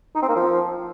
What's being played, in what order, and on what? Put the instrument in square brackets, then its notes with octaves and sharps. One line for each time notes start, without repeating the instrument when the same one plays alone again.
[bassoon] D#4
C4
A#3
F3